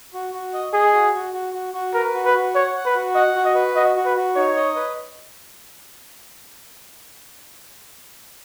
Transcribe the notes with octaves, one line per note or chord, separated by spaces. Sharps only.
F#4
F#4
D#5
G#4 D#5
F#4
F#4
F#4
F#4
F#4
A#4 B4
F#4
B4
F#4
C#5 F#5
F#5
B4
F#4
D#5 F#5
F#4
D#5
B4
F#4 D#5
F#4
B4
F#4
D#4 C#5
D#5
B4